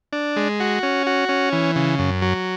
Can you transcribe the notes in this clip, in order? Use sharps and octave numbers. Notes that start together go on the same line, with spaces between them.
D4
G#3
F#4
C#4
F#4
C#4
E3
C#3
F#2
F#3